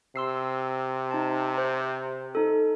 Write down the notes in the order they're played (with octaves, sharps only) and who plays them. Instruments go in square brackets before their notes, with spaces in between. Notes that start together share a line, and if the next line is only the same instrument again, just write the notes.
[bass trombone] C3 [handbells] C6 E6 C7
[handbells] D#4 A5
C5
D#4 A4